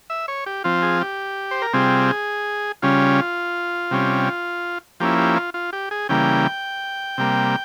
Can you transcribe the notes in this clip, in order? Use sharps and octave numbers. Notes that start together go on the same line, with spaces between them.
E5
C#5
G4
F3 C4 F4
G#4
G4
C5
A#4
C3 G3 C4 F4 G#4
C#3 G3 C#4 F4
C3 G3 C#4
F3 A#3 C#4 E4 G4
G4
F4
F4
G4
G#4
C#3 E3 G3 A#3 G5
C3 G3 A#3